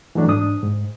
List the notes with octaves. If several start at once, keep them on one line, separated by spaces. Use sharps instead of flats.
E3 F#3 A3 D4
G#2 D4 D#6
G#2